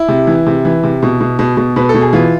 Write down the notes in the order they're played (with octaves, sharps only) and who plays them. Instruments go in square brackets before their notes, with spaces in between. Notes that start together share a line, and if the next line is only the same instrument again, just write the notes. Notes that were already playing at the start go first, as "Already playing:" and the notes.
Already playing: [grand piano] E4
C3
E3
C3
E3
C3
B2
B2
B2
B2
B2 B4
A4
B2
G#4
E3 F4